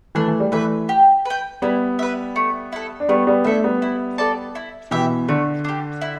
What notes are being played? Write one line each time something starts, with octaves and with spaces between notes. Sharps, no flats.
E3 A3 D4
E3
G3
E3 A3 B4 E5
G4
B4 G5
G3 B3 E4
B4 E5
A3
E4 A4
D4
G3 A3 B3
G3 B3
A3 D4 E4 A4 E5
G3 B3
E4
A4 D5 A5
E4
B2 E3 G4 E5
D3 A3
D4 G4
E4